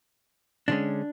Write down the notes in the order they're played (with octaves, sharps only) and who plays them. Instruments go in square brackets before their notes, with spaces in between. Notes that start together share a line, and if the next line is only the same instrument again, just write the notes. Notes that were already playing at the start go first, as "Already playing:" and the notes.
[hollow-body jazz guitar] D3 F3 G#3 C#4 D4